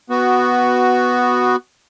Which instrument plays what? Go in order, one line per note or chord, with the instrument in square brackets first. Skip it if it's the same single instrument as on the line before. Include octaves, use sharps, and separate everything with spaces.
[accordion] B3 F#4